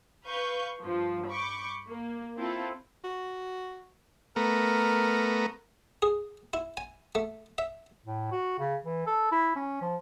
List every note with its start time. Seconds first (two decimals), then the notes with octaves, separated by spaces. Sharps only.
0.25 B4 F5 C#6 G6
0.83 G2 F3
1.29 B5 C#6 D6 G6
1.88 A#3
2.38 C4 E4 F4 A4
3.04 F#4
4.36 A3 B3 A#4 A#5
6.02 G#4
6.53 E4
6.77 G#5
7.15 A3
7.58 E5
8.06 A2
8.32 F#4
8.59 C#3
8.85 E3
9.07 A4
9.32 E4
9.56 C#4
9.82 F3